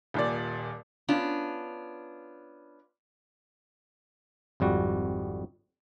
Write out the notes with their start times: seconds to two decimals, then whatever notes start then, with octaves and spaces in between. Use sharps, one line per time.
0.14 D#1 A#2 D5
1.08 B3 C#4 D4 F4
4.60 G#1 F2 G3 F#4